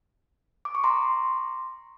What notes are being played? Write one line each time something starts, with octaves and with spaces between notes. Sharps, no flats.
D6
C#6
A#5 C6